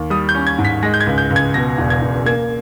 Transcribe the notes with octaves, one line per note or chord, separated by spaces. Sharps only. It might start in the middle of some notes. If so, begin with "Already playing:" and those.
Already playing: D#2
G3 D#6
G6
C#4
G#6
G#2
B6
G#3 A#6
G6
G#6
C#2
G6
C#2
G#6
B2 A#6
E1
G#6
E1
A#3 G#6